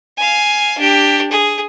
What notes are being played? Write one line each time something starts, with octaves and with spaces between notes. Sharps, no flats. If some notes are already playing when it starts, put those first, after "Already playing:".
F5 G#5
D4 G4
G#4